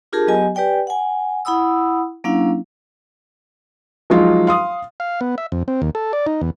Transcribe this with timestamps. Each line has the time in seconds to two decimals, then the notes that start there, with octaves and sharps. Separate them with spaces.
0.12 D4 F4 G4 G#4 A#4 A5
0.27 F#3 B3 G4 D#5 G#5
0.55 G4 B4 D5 G5 G#5
0.87 F#5 G#5
1.45 E4 F#5 B5 D#6 E6
2.24 F#3 A#3 C#4 D4 E4 F5
4.10 F3 F#3 G#3 D#4 F4
4.47 F5 C6 D#6
5.00 F5
5.21 B3
5.38 E5
5.52 F2
5.68 C4
5.82 D#2
5.95 A4
6.13 D5
6.27 D#4
6.41 E2